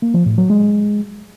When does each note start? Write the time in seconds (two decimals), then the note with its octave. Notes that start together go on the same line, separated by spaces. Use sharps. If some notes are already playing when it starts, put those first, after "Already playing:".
0.02 A#3
0.14 F3
0.26 A2
0.38 F#3
0.50 G#3